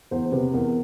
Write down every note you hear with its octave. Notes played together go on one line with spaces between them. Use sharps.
E2 C5
C3 B4
E2 A#4